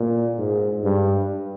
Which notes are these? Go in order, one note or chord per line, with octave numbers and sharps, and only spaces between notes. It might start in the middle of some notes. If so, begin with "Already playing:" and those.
Already playing: A#2
G#2
G2